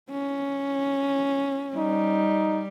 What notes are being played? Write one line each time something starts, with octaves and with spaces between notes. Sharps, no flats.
C#4
G3 D#4